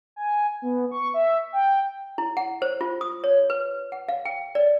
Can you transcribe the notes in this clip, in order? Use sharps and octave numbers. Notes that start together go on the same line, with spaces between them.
G#5
B3
C#6
E5
G5
E4
F#5
C5
F4
D#6
C#5
B4
F#5
F5
G5
D5